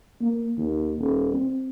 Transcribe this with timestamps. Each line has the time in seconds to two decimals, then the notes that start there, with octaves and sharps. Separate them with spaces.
0.21 A#3
0.57 D#2
0.99 D#1
1.34 C4